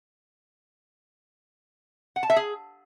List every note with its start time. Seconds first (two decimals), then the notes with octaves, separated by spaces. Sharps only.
2.16 F#5
2.23 A5
2.30 E5
2.36 G#4